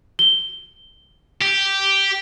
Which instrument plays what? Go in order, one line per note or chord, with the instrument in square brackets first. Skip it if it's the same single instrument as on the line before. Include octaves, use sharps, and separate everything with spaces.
[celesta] G7
[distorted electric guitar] G4